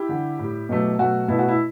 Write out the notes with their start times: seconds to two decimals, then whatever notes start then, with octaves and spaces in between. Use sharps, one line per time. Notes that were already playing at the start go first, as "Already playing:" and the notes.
Already playing: E4 G4
0.09 D3 G3
0.39 A2 G3
0.69 B2 F#3 A3
0.98 B2 F#3 A3 F#4
1.28 B2 E4
1.33 A3
1.39 F#4
1.48 E4